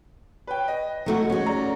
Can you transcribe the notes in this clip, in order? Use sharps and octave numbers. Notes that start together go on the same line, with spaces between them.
B4 C#5 G5
D#5
F#3 A3 F#4
G#3 C#4 F#4
C#5 D5 A#5